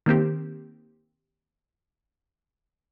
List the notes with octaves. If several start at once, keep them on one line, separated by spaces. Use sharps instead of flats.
D#3 A#3 C4 G4